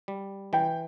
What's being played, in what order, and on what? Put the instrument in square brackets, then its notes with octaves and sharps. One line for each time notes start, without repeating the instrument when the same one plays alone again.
[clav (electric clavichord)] G3
[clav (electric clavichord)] E3 [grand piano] G5